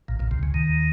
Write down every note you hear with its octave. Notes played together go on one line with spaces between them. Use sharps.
A#1 A#2
A#1 A#2
C2 C3
C#2 C#3
D#2 D#3